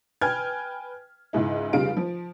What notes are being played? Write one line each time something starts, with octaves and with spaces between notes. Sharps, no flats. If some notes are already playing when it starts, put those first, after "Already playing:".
B4 G5 G#5 F6 G#6
C#2 G#2 E4
F1 C#3 G3 F4 F5 D7
F3